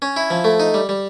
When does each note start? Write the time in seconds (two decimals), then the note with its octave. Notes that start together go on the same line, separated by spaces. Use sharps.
0.02 C#4
0.16 E4
0.30 F3
0.44 A3
0.60 D#4
0.74 G3
0.89 G3